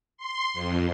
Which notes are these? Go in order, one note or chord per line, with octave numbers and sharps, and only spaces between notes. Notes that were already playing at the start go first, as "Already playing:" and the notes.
C6
F2